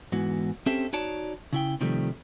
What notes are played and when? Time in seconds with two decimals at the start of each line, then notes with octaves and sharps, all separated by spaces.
0.12 E2 G#2 E3 F#4
0.66 C4 C#4 G4 A4 C5 E5
0.93 D#4 F#4 C#5 D5 A5
1.53 C#3 E4 G5
1.81 C3 D#3 F3 G3 A3